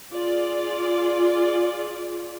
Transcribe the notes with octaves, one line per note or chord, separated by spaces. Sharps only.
F4 G#4 D5